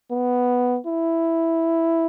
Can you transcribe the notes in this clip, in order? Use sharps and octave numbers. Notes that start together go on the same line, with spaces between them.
B3
E4